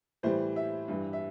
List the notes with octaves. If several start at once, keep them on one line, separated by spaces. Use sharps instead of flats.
A2 E3 G3 C5
E5
G2 E3 G3
E5